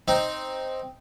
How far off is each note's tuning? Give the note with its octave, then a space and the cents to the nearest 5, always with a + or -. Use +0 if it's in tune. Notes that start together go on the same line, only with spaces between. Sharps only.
C4 +0 D#4 +0